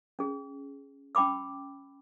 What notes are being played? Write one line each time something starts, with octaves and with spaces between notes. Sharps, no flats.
C#4 G#4
C#4 G5 B5 D6 E6